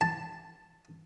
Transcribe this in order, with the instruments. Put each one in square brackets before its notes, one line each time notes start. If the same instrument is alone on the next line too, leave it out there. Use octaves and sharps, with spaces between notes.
[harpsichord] A5